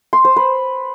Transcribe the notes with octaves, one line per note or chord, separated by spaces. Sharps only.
C6
C5
B4